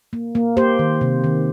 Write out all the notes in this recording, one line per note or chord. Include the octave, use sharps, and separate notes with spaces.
A#3
A#3
A#3 G4 C5
D#3
C3
D#3